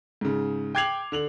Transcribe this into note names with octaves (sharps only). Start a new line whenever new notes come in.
G#2 C#3
G5 D6 G#6 C7 F7 F#7
D3 F7 F#7